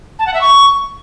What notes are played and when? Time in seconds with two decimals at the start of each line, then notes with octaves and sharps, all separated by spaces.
0.19 A5
0.26 F#5
0.34 E5
0.41 C#6